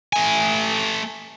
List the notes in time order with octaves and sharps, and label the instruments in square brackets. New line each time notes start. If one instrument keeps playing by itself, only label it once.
[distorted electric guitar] A3 G#5